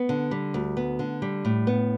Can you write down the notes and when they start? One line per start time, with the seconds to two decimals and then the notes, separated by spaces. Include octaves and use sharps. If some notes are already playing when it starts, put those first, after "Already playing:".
Already playing: B3
0.09 D3
0.31 G3
0.54 D2
0.77 B3
0.99 D3
1.22 G3
1.45 A2
1.67 B3